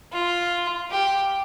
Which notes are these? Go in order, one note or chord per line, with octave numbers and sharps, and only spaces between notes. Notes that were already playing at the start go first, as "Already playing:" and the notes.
F4
G4